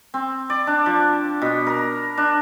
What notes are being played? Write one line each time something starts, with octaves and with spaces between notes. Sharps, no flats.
C4
D5
D4
F3
B2
A#4
D4